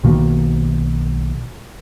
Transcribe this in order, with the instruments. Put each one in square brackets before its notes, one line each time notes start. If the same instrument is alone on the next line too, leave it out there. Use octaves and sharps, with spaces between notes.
[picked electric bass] B1 B2 D#3 A#3